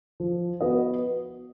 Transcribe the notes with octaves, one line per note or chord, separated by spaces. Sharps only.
F3
B3 F#4 B4 D#5